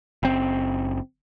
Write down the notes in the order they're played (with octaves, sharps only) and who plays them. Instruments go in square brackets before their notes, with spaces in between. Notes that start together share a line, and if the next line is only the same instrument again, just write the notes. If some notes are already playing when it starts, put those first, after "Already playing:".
[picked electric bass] F#1 C4